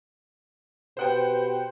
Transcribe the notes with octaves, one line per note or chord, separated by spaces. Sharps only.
B2 G4 B4 C5 F#5 G5